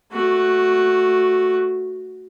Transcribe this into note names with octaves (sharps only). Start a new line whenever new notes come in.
A3 F#4